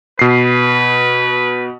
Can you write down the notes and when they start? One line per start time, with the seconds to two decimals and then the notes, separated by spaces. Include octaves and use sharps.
0.19 B2 B4 C7